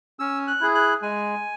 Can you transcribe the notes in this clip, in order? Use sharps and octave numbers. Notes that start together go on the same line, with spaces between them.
C#4 E6
F#6
E4 G#4
F#6
G#3 G#5